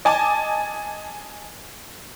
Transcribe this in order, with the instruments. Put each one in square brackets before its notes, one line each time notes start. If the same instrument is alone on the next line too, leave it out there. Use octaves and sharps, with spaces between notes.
[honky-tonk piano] D#5 G#5 A5 D6